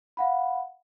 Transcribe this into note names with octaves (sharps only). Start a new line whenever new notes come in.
F5 F#5 B5